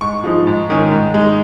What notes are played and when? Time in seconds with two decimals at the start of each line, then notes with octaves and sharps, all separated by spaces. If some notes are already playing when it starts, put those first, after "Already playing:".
0.01 G#2 C#6
0.24 F3 G#3 D#4
0.47 G#2
0.70 D#3 C#4
0.92 G#2
1.14 G#3 D#4